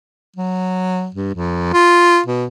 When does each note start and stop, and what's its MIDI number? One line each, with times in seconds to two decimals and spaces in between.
0.36 1.09 54
1.14 1.32 43
1.35 1.72 41
1.73 2.20 65
2.26 2.46 47